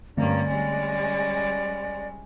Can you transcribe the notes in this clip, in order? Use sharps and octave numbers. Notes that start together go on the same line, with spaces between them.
G2 D3 A3 A#3 C4 C#4 D5
G3 G#3 C#4